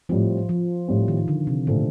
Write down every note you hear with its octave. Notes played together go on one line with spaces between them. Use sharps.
A2 F3 G3 C4
F3
A2 G3 C4
D#3
D3
C3
A#2 D3 A3 C4